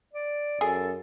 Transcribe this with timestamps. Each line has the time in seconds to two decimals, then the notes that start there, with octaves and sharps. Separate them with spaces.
0.13 D5
0.61 F#2 G#4 A4